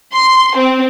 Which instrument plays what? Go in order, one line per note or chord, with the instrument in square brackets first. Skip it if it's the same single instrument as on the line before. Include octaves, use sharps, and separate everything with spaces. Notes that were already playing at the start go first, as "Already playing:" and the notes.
[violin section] C6
C4